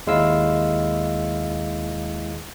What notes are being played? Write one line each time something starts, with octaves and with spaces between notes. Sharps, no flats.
D#2 G#3 E4 F5 E6